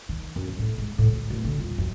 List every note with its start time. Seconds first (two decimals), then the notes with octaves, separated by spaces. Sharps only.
0.09 D#3
0.36 F#2
0.47 G2
0.59 A2
0.78 G#2
0.98 A2
1.13 D2
1.30 D1
1.45 D3
1.58 D#1
1.78 F#2